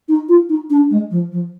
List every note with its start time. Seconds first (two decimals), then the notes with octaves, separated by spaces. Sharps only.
0.08 D#4
0.29 F4
0.49 D#4
0.70 D4
0.90 G#3
1.11 F3
1.32 F3